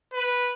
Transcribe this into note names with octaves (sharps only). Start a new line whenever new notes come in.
B4